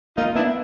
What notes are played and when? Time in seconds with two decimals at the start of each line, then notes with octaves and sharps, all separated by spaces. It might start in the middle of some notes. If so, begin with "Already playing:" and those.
0.17 A#3 D#4 F4
0.35 B3 D4 E4